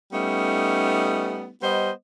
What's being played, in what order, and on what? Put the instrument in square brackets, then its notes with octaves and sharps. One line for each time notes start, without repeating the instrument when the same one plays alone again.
[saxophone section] G3 A3 B3 C#4 D#4
G3 B3 C5 D#5